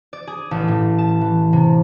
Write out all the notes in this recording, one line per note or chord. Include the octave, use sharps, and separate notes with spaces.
D5
G#4
A1
A2
A5
E3
C3